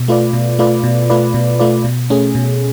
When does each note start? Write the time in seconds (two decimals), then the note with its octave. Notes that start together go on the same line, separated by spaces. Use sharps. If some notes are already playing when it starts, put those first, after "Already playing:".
Already playing: B2
0.08 A3 F4 B4 D5
0.33 B2
0.59 A3 F4 B4 D5
0.84 B2
1.10 A3 F4 B4 D5
1.34 B2
1.59 A3 F4 B4 D5
1.84 B2
2.10 A3 C#4 G#4
2.35 B2